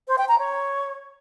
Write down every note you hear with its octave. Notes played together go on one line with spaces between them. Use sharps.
C5
G5
A#5
C#5